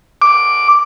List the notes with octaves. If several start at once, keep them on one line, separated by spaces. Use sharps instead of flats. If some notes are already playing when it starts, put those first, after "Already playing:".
D6